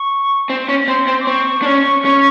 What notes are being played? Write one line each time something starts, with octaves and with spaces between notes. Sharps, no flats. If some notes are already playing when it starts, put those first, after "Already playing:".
Already playing: C#6
C4
C#4
C4 C6
C4
D6
C4 C#6
D4
C#4
C#4